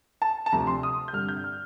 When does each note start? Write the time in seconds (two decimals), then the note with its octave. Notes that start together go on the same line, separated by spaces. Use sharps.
0.22 A5
0.46 A5
0.52 D2 C3 F3 A#5
0.67 C6
0.83 D#6
1.08 G6
1.13 G2 D3 G3 C4 F6
1.29 G6
1.44 F6